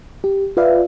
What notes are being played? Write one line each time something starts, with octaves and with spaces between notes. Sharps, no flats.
G4
F4 B4 D5 E5 F5